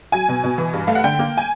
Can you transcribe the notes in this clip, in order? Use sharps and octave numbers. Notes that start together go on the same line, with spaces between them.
F#3 G#5
B2
B2
E3
G2
A3 F5
F#5
D3 G5
A#3
G#5